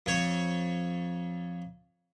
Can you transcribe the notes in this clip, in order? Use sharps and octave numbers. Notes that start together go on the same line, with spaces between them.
F2 C#5